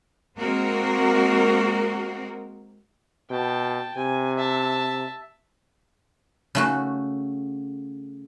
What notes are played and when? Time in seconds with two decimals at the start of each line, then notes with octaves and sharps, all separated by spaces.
0.38 G#3 A#3 C4 F#4 A#4
3.30 B2 G5 A5
3.97 C3 G#5
4.38 E5 A5
6.55 C#3 A3 F#4